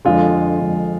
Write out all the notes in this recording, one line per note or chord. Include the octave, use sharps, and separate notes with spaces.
F2 D3 G#3 F4
F2 D3 G#3